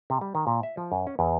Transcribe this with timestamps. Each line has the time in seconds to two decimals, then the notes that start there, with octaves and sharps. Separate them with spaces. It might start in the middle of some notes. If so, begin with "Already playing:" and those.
0.10 C3
0.21 G3
0.35 D#3
0.47 A#2
0.63 E5
0.77 F3
0.92 F#2
1.07 C#4
1.19 E2